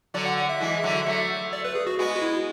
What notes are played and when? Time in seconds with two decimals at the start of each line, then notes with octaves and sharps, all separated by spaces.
0.14 D3 F#3 D5
0.26 F#5
0.37 F#5
0.49 E5
0.60 E3 G#3
0.84 D3 F#3
1.06 F#3 A3
1.53 D5
1.65 B4
1.75 G#4
1.87 F#4
1.99 G#3 B3 F#4
2.15 F#4
2.22 E4